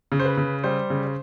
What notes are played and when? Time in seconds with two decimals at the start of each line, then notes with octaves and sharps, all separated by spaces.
0.12 C#3
0.20 C5
0.25 B4
0.37 C#3
0.64 G3 C5
0.90 C#3